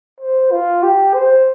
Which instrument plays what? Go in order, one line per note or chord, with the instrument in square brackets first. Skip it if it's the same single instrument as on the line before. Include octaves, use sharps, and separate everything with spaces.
[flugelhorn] C5
F4
G4
C5